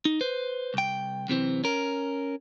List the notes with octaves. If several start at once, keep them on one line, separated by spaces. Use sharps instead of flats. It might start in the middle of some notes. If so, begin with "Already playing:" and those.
D#4
B4 C5
C2 G5
F#2 C3 E3 C4
C#4 A#4